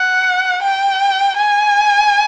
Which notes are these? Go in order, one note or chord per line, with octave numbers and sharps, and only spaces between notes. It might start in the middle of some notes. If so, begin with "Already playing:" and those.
Already playing: F#5
G5
G#5